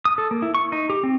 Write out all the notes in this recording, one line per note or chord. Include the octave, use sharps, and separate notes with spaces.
D#6
A4
A#3
E4
C#6
D#4
G4
C4